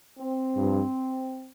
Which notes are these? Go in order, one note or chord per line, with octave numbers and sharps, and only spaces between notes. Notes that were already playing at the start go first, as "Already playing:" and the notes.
C4
G2 F3